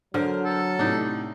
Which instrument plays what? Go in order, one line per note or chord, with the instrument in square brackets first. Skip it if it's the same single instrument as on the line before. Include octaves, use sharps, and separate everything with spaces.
[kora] D3 [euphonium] F#3 [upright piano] A#4 C5 F6
[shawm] A4
[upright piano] A2 C3 [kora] D4 D#4